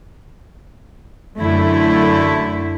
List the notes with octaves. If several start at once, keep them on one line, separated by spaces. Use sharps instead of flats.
F#2 D3 A3 E4